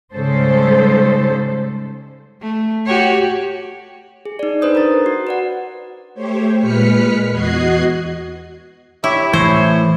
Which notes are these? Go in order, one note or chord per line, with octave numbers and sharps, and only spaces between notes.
G#2 C#3 G3 A4 C5
A3
F#4 G4 C#5
G#4
D#4 D5
D4 B4 C5 D#6 G6
A#4 A#5 A6
F#4
B4 D5 F#5
A3 G4 C5 C#5
A#2 G#3 B4 F6 B6 C#7
E2 F#4 D#5 F#6 G#6 C7
E4 G4 C#5 E5
A2 E3 E4 C5 C#5